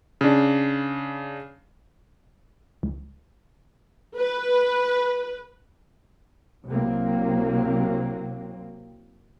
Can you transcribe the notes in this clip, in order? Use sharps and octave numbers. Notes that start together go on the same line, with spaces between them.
C#3 D4
C#2
B4
C2 C3 F#3 A#3 C4